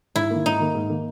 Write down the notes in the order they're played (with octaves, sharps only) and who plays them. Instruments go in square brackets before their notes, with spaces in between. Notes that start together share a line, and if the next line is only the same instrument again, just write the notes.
[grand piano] G#2 [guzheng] E4
[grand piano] D#3 A#3
[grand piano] G#2 [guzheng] D#4
[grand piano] D#3 A#3
G#2
D#3 A#3